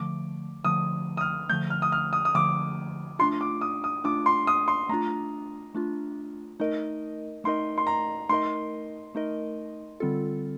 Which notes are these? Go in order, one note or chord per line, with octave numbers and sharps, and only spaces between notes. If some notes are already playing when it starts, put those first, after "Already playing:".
Already playing: D3 F3 A3 D6
D3 F3 A3 D#6
D#6
F6
D3 F3 A3 G6
F6
D#6
F6
D#6
D#6
D3 F3 A3 D6
A3 D4 F4 C6
D6
D#6
D#6
A3 D4 F4 D6
C6
D#6
C6
A3 D4 F4 A#5
A3 D4 F4
A3 D#4 A#4 D#5
A3 D#4 A#4 D#5 C6
C6
A#5
A3 D#4 A#4 D#5 C6
A3 D#4 A#4 D#5
D3 G3 C4 F4 A4